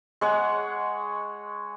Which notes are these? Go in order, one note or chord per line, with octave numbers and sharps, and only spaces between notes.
G#3 C#5 F#5